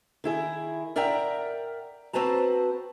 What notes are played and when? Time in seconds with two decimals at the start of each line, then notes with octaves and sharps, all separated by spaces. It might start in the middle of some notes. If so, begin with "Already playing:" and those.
0.24 D#3 E4 G#4
0.96 A#4 D5 E5 F#5 G5 A#5
2.13 C4 F#4 B4 C5 A5 A#5